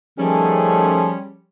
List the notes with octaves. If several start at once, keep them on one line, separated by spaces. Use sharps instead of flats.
D#3 F3 G3 A3 C#4 G#4